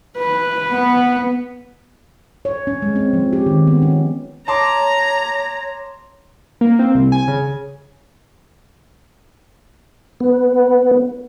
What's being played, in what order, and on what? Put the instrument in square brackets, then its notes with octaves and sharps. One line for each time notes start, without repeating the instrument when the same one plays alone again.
[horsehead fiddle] B4
[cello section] B3
[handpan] C#5
C#4
G#3
C4
F3
G4
D#3
B3
C#4
[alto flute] C#5 [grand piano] A5 C6 D6 [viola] A#5
[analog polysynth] A#3
C4
C2
G#5
C#3
[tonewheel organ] B3